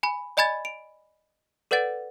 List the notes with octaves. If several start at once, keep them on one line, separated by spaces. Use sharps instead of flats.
G#5 B5
D5 D#5 G#5 B5 G#6 A6
D7 F7
A4 B4 D5 F#5 A6 D7